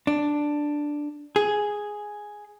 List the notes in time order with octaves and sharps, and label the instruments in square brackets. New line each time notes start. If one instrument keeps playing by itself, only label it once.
[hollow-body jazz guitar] D4
G#4